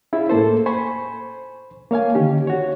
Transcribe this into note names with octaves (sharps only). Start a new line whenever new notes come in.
C#4 E4 F4 G#4
A2 A#3 A4 C5
C5 G#5 B5 C#6
A#3 C#5 F5 G#5
D3 D#3 C#4 D#4 G4
F#4 C#5